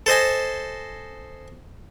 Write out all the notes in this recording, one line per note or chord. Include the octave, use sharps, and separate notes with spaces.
A4 C5 D#5 G#5